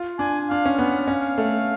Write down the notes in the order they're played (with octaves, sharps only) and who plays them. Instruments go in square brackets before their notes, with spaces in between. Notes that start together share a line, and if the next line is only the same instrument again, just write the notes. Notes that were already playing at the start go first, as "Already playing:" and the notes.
Already playing: [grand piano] F4
[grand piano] D4 [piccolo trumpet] G#5
[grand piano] D4 [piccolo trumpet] F5
[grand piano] C#4
[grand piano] B3 [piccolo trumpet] F#5
[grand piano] C#4 [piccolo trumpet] F5
[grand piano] A3